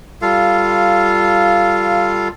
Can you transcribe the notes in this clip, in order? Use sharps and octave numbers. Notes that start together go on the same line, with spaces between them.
G3 F4 A4 F5